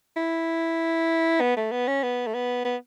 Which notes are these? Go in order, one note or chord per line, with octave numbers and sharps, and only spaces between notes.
E4
B3
A3
B3
C#4
B3
A3
B3
B3